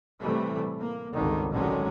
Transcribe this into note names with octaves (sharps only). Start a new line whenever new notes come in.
A2 C3 E3 G3 A3
A#3
G#1 C#2 G2 D3 D#3
A1 D3 D#3 F#3 G#3 C#4